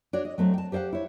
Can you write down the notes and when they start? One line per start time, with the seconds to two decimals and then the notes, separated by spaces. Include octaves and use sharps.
0.13 D4 F#4 C#5 D5
0.25 D#5
0.38 F#3 A3 C4
0.54 G5 A5
0.72 G4 C5 D5 F5 F#5
0.93 E4 C#5